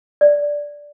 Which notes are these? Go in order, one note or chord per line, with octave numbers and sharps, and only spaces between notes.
D5